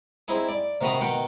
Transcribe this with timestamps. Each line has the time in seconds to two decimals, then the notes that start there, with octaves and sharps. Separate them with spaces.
0.28 C4 D#4 E4 G#4
0.49 D5
0.81 C3 D#3 F#4 A#5 B5 D#6
1.00 B2 D#3 F#5 G5